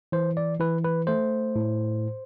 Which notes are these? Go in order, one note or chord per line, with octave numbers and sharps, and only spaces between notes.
E3 C5
D5
E3 B4
B4
A3 C5
A2